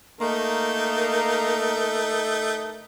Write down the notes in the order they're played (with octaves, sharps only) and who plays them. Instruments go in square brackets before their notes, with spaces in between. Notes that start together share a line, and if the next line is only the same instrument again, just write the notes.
[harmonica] A3 D#4 [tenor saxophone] A#3 [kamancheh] A#4